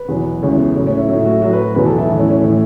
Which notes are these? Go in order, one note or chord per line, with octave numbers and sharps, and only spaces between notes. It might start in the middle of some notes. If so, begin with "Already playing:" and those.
Already playing: B4
E2 B2 F#3
C#2 C#3 E3 C#4
B3
A2 F#3 C#4
C#4
E4
A2 F#3 E4
F#4
A2 F#3 F#4
B4
E2 B2 F#3 B4
A4
E4
A2 E3
C#4
C#4
A2 E3 E4